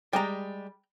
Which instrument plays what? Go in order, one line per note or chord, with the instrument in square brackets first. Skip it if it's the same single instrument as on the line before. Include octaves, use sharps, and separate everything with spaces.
[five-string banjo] G3 G#3 [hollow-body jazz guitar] G5 A#5